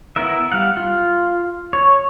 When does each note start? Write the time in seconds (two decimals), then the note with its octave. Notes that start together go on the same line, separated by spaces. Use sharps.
0.16 B3 E4 A#4 E5
0.52 G3 F5 F#5
0.77 F4
1.73 C#5